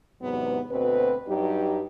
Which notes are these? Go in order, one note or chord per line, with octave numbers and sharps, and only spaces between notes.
E2 G#2 C3 F#3 B3
D2 B2 C4 B4
G2 F#3 D#4 G4